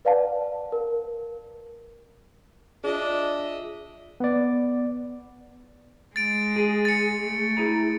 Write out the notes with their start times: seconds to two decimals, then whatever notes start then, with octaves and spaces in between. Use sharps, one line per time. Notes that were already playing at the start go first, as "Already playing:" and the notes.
0.05 B4 D5 F5 F#5 A5
0.72 A#4
2.84 D4 F4 G#4 D#5 E5
4.20 B3 D5
6.16 G#3 A6 D7
6.56 G#4
6.85 A6 C#7
7.23 A3
7.57 E4 G#4 A#5